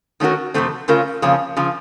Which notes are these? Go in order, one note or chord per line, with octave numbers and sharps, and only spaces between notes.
D#3 A3 C#4 F#4 A#4
F2 C3 D#3 A3 C4
C#3 A3 C#4 F4 A#4
F2 C#3 F3 A#3 C#4
C#3 F3